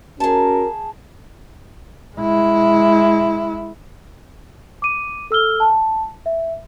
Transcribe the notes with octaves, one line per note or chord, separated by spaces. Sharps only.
C#4 F#4 G#4 A#4 A5
G#3 E4
D6 D#7
A4 E6 F6 G7
A5
E5